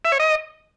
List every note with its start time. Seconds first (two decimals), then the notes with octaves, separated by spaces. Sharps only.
0.05 E5
0.12 C#5
0.20 D#5